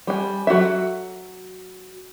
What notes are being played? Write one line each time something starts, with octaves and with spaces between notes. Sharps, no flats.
G3 G#5
F#3 F#4 A4 E5